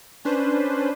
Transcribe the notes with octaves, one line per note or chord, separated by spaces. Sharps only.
C#4 D4 B4 C5